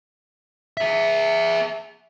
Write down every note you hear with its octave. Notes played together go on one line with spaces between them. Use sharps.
G#4 E5